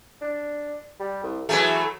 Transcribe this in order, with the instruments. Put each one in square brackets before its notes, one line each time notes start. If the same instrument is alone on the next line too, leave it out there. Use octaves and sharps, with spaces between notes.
[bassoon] D4
G3
C2
[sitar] E3 F#3 A3 [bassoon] G#4